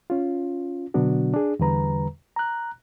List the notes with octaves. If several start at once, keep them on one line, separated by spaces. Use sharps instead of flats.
C#4 F4
B2 D3 F#3 B3 D4 F#4
D4 G#4
E2 D3 G3 B4 A#5
A#5 F#6